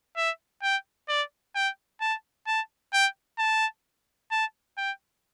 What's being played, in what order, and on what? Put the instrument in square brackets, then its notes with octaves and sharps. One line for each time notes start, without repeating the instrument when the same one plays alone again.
[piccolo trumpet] E5
G5
D5
G5
A5
A5
G5
A5
A5
G5